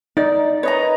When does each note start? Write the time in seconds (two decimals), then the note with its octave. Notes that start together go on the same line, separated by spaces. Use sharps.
0.17 D#4 D5
0.63 B4 C#5 D#5 A#5